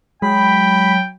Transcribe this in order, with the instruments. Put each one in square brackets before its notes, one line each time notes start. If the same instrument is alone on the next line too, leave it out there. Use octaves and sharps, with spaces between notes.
[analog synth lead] F#3 [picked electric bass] G#3 [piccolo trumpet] G5 [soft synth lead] B5